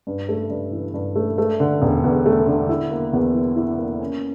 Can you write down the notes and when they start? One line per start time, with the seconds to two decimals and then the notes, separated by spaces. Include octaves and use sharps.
0.07 G2
0.29 A3
0.50 G2
0.73 E3
0.94 G2
1.15 A3
1.38 A3
1.60 D3
1.82 E1
2.04 E2
2.26 A3
2.48 D3
2.69 E4
2.91 A#3
3.13 E2
3.34 E3
3.56 E4
3.78 A#3
4.00 C#4